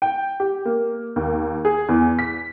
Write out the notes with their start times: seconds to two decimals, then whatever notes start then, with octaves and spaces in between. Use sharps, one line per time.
0.02 G5
0.40 G4
0.65 A#3
1.16 D#2
1.65 G#4
1.89 E2
2.19 B6